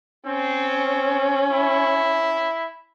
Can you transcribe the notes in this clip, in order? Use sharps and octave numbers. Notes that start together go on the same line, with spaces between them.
C4 C#4
E4